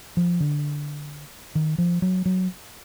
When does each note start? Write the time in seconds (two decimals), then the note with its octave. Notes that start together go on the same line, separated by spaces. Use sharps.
0.17 F3
0.40 D3
1.55 D#3
1.78 F3
2.02 F#3
2.26 F#3